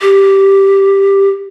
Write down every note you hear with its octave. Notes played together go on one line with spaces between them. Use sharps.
G4